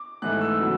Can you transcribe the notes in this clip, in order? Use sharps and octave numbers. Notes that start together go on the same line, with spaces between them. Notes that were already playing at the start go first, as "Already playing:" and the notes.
Already playing: D6
G#2 E3 A3 F#6
E6
C#3 F#3 B3